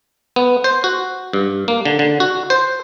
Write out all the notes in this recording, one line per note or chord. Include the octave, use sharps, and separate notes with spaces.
B3
C5
F#4
G2
A#3
D3
D3
F#4
C5